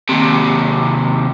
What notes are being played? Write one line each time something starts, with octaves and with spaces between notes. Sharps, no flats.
D#2 C3